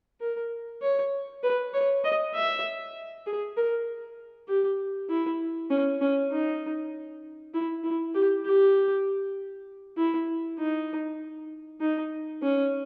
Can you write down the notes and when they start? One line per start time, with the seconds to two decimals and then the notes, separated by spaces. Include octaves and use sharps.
0.20 A#4
0.82 C#5
1.43 B4
1.74 C#5
2.04 D#5
2.35 E5
3.26 G#4
3.57 A#4
4.48 G4
5.09 E4
5.70 C#4
6.01 C#4
6.32 D#4
7.54 E4
7.83 E4
8.14 G4
8.45 G4
9.97 E4
10.58 D#4
11.81 D#4
12.42 C#4